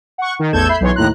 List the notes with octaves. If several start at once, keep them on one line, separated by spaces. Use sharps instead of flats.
F#5 C#6
D#3
A1 E2 A4 G6 G#6 E7
E5 B5 G6 C7
B1 E3 C#5 C6
D#2 A2 A#5 F#6